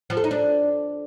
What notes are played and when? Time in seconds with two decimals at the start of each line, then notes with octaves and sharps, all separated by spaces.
0.10 F3
0.17 A4
0.24 D#4
0.31 D4